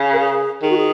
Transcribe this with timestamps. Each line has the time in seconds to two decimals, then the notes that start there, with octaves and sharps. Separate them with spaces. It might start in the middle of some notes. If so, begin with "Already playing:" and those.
Already playing: C#3
0.13 A#4
0.19 G#4
0.62 D#3 G#4
0.70 F#4
0.77 G#4